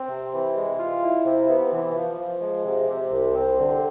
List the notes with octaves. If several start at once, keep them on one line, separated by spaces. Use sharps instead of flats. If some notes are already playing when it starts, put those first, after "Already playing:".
Already playing: C4
C3
E3
G#3
F4
E4
C3
B3
E3
F3
F3
G#3
C3
C3
C2
C4
D3